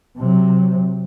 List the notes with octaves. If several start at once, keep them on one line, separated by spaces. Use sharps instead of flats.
C3 F#3